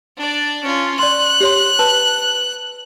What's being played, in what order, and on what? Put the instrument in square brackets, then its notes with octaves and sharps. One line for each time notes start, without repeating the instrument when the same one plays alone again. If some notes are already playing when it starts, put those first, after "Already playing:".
[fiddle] D4 D5
C#4 F4
[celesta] D5 C6 [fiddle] F#6
[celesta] G4 C#5 C6
B4 A5